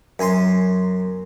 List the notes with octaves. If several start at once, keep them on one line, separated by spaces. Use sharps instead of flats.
F#2 G#5 A#5 C6